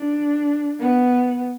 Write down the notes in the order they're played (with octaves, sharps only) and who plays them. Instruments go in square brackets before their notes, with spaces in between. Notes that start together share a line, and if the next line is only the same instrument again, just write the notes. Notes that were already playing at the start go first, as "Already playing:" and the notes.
Already playing: [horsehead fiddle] D4
B3